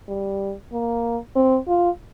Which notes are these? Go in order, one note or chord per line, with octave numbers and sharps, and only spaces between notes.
G3
A#3
C4
F4